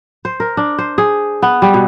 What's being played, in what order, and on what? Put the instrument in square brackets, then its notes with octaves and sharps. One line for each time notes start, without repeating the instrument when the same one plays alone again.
[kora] C5
A#4
D4
C5
G#4
B3
G3
B2